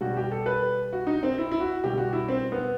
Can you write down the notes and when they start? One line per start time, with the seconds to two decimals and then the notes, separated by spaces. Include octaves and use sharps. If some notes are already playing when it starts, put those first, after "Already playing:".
0.01 B2 G3 F#4
0.17 G4
0.31 A4
0.46 B4
0.93 F#4
1.07 D#4
1.23 C4
1.38 E4
1.51 E4
1.60 F#4
1.83 B2 G3 G4
1.98 F#4
2.13 E4
2.29 C4
2.52 B3